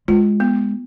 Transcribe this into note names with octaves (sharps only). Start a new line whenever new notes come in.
G#3 F4
B3